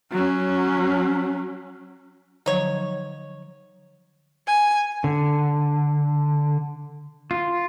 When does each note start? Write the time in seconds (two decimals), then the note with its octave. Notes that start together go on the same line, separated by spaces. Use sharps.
0.12 F#3 C#4
2.46 D3 F3 F#3 D#4 C#5
4.47 G#5
5.04 D3
7.31 F4